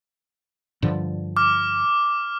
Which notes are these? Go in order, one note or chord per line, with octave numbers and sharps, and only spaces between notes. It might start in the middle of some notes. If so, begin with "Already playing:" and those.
G2 D3 F3
D6 F6